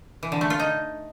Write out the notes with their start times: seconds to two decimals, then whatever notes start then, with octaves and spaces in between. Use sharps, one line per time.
0.23 E3
0.32 D3
0.41 A3
0.50 F4
0.60 D#4